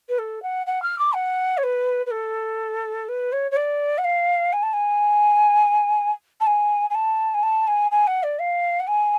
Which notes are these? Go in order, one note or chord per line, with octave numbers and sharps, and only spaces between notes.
B4
A4
F#5
F#5
F6
D6
F#5
C#5
B4
B4
A4
B4
C#5
C#5
D5
F#5
F5
G#5
A5
G#5
A5
G#5
G#5
A5
G#5
A5
G#5
G#5
F#5
D5
F5
F#5
G#5